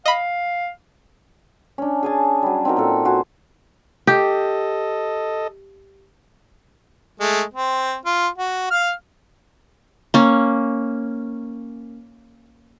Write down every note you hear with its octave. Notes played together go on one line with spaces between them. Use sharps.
D#5 F5 B5
C#4 D4
G#4 G#5 A5
F#3 G3
C4 D#4 F#4 A#4
A#2 A4
F#4 C5 G#5
G4 A4 D#5
G#3 A3
C4
F4
F#4
F5 F6
A#3 C#4